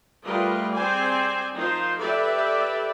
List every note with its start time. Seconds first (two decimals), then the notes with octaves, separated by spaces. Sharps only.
0.24 G3 A3 F4 A#4 B4 D#5
0.73 C4 G#4 C5 D5 G#5
1.55 F3 D#4 F4 A#4 C5
2.00 G4 A4 B4 D5 E5